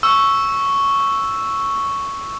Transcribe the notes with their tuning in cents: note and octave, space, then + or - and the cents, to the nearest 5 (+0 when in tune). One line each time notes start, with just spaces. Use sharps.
C#6 +0 E6 +0